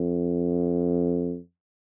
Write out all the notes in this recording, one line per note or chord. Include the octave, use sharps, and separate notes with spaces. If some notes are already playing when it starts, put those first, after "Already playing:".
Already playing: F2